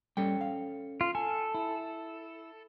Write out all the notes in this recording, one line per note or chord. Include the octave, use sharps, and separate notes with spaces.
G3 C#4 A4 G5
F5
F4
A4 G#5
E4